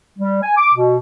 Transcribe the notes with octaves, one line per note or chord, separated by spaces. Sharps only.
G3
G#5
D6
B2